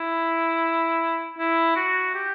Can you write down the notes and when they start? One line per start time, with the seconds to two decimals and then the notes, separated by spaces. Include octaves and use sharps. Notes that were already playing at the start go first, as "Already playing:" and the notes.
Already playing: E4
1.38 E4
1.76 F#4
2.15 G4